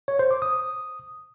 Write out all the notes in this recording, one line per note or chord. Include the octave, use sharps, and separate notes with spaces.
C#5
C5
D6
D#6